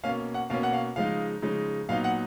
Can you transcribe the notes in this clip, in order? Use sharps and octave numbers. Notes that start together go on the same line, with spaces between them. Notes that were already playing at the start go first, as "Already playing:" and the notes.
B2 A#3 C#4 F5
F#5
B2 A#3 C#4 F5
F#5
F5
C#3 F3 G#3 D#4 F5
C#3 F3 G#3 D#4
A#2 F#3 B3 D#4 F5
F#5